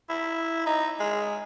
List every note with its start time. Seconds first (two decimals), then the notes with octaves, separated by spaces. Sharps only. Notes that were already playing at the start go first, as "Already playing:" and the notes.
0.09 E4
0.66 D#4
1.00 G#3